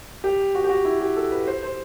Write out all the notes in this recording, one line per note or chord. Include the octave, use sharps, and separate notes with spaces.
G4
F#4
G4
F#4
E4
G4
A4
B4
C5
C5